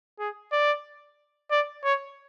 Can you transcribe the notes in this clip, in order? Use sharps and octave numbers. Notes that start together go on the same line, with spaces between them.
G#4
D5
D5
C#5